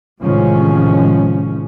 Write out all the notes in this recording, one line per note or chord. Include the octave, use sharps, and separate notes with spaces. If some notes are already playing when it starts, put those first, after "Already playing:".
A1 C3 D#3 F3 G#3 C#4